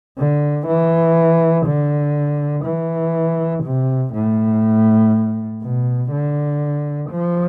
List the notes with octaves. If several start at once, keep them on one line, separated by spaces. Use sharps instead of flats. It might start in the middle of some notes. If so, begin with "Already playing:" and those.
D3
E3
D3
E3
C3
A2
B2
D3
F3